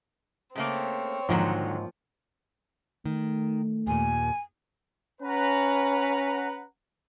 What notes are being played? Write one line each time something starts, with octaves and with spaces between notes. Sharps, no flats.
C#3 A3 A#3 C4 C#5
G#2 D3 D#3 F3 F#3 A#3 F#5
D#3 A3
D#2 A#2 G#5
C#4 B4 F#5 A#5